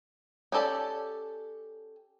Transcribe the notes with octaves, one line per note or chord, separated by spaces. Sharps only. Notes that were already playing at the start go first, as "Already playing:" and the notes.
C#4 G4 A4 D5 A5